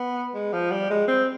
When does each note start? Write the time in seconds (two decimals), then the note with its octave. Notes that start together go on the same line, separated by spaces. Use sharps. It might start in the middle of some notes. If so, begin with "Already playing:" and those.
Already playing: B3
0.35 G#3
0.53 F3
0.71 G3
0.90 G#3
1.08 C4